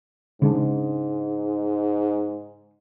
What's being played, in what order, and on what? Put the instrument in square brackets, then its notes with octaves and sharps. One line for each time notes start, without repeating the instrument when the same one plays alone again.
[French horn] G#2 [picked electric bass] C#3 G#3 D4